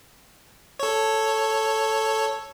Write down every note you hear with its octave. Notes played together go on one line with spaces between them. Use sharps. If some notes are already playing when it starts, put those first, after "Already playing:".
A4 C#5